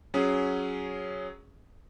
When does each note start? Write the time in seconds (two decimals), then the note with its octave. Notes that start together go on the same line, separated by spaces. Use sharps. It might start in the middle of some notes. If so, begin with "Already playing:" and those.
0.14 F#3 C#4 G#4